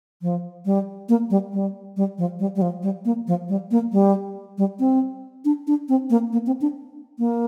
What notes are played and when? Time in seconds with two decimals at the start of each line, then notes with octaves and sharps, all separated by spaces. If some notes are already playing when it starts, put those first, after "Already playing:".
0.22 F3
0.65 G3
1.09 A#3
1.30 G3
1.53 G3
1.97 G3
2.18 F3
2.39 G3
2.56 G3
2.62 F3
2.83 G3
3.05 A#3
3.27 F3
3.49 G3
3.71 A#3
3.92 G3
4.58 G3
4.79 C4
5.45 D4
5.67 D4
5.89 C4
6.10 A#3
6.33 A#3
6.47 C4
6.61 D4
7.19 A#3